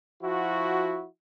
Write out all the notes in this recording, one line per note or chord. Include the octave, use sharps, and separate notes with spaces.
F3 E4 F#4